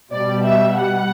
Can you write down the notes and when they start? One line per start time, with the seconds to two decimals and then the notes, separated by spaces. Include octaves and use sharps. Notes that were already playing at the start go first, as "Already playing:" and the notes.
0.12 B2 G3 D5
0.44 E5
0.74 F#5